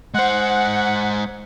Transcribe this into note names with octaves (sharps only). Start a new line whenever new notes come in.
G#3 C5 F#5